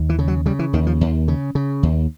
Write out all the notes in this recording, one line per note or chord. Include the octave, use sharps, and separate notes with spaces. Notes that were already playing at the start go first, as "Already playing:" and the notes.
Already playing: D#2
E3
C#3
F#3
C#3 G3
E3
D#2 D#3
F3
D#2
C#3
C#3
D#2